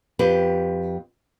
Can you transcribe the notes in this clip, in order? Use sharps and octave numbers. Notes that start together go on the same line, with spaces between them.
F2 G4 B4